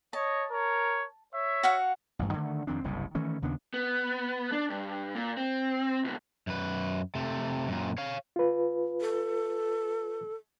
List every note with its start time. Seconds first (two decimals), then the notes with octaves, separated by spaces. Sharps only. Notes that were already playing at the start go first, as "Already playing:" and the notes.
0.13 C#5 D#5 A5
0.51 A#4 C#5
1.34 C#5 E5
1.63 F#4 F5 F#5
2.19 A1 G2
2.33 D3 D#3 G#3 A3
2.67 F2 D#3 C4 D4
2.84 F#1 C2 G2 C3
3.15 D#3 E3 A3 C#4
3.42 D#2 C#3 B3 D4
3.74 B3
4.52 D4
4.70 G2
5.15 A#2
5.37 C4
6.04 C#2 B2
6.47 F#2 B4
7.15 C3 A3
7.68 F#2 A#2
7.98 C#5 F5
8.36 F4 B4
9.01 A4